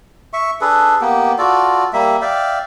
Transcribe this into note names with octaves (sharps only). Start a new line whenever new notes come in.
E5 C#6
D4 G#4 A4 B4
A#3 B3 G4
F4 F#4 A4 D5
G3 A#3 E5
D5 E5 F5 G5